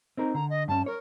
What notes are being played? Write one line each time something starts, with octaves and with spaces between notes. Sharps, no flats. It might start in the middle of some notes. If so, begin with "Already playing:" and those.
C4 D#4 A#4
D3 A#5
D#5
G2 C#4 A5
A#4 C#5